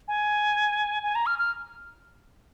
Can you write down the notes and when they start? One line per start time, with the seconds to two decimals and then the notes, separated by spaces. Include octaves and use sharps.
0.08 G#5
1.03 G#5
1.15 A#5
1.26 F6
1.39 F6